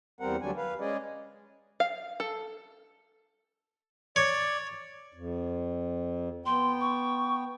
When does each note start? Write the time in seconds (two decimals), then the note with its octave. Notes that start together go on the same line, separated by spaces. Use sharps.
0.20 E2 G3 C4 A#4 F#5
0.42 D2 D3 F#3 G3 D4 G#5
0.57 B4 F5
0.80 G#3 C#4 G#4 D5 D#5
1.80 F5
2.20 A4
4.16 C#5 D5
5.13 F2
6.46 B3 G5 C6
6.81 C#6